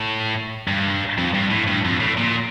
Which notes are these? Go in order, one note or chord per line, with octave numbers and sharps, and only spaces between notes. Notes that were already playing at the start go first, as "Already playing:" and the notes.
Already playing: A2
G2
F2
G2
A2
G2
F2
A2
A#2